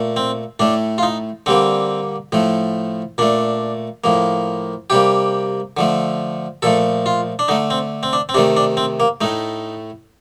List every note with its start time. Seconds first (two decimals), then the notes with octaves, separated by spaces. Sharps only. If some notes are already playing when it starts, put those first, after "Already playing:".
Already playing: A#2 A3
0.16 C4
0.60 A2 A3 D4
0.98 F4
1.03 D#4
1.46 D3 G3 A#3 C4
2.32 A2 F3 A3
3.18 A#2 A3 D4
4.04 A2 F3 A#3
4.90 C3 G3 A#3 G4
5.77 D3 F3 A3
6.62 A#2 F3 A3 A4
7.06 F4
7.39 D4
7.48 D3 A3 D#4
7.70 C4
8.03 C4
8.13 D4
8.29 C4
8.34 C3 D4
8.37 D#3 A3
8.57 D4
8.77 C4
9.00 A#3
9.21 A2 A3 D#4